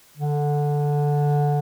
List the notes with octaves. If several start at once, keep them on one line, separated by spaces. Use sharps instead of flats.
D3